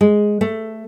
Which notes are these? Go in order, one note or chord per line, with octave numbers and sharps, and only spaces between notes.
G#3
A3